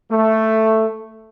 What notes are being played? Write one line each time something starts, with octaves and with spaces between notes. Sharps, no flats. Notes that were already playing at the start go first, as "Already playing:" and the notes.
A3